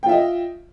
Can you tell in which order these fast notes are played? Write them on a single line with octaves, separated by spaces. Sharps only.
G5 F4 E5 D#5